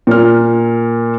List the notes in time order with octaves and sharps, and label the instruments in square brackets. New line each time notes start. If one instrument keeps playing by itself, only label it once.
[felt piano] A#2 F6